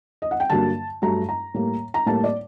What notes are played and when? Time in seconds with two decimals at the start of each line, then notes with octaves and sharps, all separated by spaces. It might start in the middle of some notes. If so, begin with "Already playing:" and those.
0.22 D#5
0.31 F#5
0.40 G5
0.50 G2 D3 F#3 A#3 A5
1.02 G2 F#3 A3 A#5
1.29 A#5
1.54 A2 G3 A#3
1.94 A#5
2.06 A2 G3 A#3 A5
2.24 D5